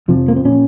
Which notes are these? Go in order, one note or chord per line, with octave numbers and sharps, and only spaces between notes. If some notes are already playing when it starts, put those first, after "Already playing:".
F2 C3 F3
A#3
C4
A#2 C#4